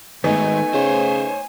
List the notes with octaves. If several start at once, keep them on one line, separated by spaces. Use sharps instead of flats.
D#3 G#3 A3 B3 D#4 G#5
C#3 C5 C#5